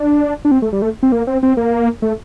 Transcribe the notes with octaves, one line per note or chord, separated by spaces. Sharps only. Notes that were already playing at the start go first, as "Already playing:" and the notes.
Already playing: D4
D4
C4
A3
G3
A3
C4
A#3
C4
C4
A#3
A3